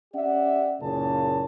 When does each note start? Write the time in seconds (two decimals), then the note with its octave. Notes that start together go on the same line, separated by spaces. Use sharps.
0.14 C#4 G4 D5 E5 F#5
0.82 F#1 A#2 C#3 A#3 G#4 A5